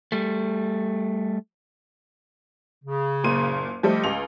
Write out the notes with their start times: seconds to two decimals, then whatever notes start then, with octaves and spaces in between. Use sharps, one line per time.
0.12 G3 A3
2.84 C#3
3.24 F#1 A#2 D#7
3.83 F3 G3 A3 G4 D#5
4.04 C#2 F7